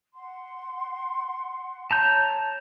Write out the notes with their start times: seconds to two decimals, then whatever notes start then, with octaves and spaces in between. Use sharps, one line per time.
0.14 F#5 C6
1.91 C#5 A5 A#5 G6